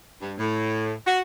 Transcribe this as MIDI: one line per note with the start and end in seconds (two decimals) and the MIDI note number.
0.22 0.33 43
0.38 0.93 45
1.06 1.19 66